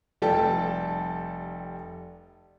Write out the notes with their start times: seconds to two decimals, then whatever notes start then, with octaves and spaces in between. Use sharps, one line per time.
0.22 F1 G3 A4 G5 A5